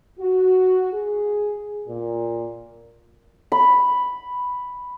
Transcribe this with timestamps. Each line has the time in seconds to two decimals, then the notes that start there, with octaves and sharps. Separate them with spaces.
0.19 F#4
0.93 G#4
1.87 A#2
3.52 B5